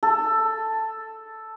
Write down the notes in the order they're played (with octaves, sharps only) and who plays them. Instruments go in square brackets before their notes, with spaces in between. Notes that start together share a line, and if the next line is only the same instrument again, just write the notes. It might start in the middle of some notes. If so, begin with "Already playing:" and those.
[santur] A4